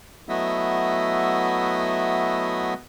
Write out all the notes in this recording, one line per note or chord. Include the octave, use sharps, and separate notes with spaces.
F#3 A3 B3 E4 D#5 E5